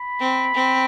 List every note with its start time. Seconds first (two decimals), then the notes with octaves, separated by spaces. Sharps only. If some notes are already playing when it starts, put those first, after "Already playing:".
Already playing: B5
0.19 C4
0.54 C4